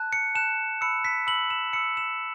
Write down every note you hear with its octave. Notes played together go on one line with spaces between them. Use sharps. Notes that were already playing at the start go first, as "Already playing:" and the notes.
Already playing: A5 F#6
C#7
A5 F#6 E7
B5 E6 C#7
B6
B5 E6 F#7
E7
B5 E6 C#7
E7